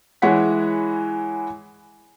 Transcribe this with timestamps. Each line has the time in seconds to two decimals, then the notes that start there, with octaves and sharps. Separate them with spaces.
0.22 E3 G#3 E4 C#5 F#5 B6